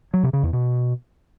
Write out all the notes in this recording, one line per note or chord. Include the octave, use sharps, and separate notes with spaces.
F#3
C3
C#3
E2
B2